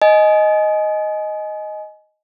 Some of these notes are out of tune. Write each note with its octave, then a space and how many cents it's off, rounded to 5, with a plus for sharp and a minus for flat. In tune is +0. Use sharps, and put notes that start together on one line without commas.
D#5 +0 G#5 +25